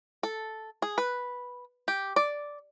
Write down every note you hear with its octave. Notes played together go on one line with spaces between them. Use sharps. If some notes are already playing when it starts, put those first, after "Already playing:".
A4
G#4
B4
G4
D5